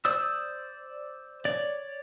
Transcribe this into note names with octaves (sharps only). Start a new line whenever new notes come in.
C5 D5 D#6 E6
C#5 D5